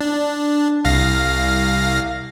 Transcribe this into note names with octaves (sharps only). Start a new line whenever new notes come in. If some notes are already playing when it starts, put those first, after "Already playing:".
D4
C2 F5 A#6